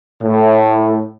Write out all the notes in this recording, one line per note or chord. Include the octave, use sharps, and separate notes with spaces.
A2